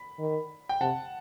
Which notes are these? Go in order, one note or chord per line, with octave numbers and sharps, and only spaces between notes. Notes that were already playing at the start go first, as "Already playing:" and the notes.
Already playing: B5
D#3
G5
C3 F#5 A5